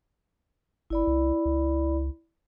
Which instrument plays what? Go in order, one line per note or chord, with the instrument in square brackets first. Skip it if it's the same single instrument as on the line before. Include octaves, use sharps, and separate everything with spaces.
[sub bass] G1 [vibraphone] E4 D5 B5
[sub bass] C2
C#2